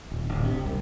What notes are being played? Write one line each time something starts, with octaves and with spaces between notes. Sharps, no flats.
D#1
D1
C3
C2